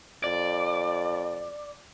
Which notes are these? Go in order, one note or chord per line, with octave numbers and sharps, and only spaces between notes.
F2 D5